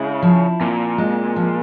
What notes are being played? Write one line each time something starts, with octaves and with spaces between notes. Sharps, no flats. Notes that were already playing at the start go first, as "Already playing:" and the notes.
Already playing: C#3 G#3 E4
F3
A#2 C4
G#3
F3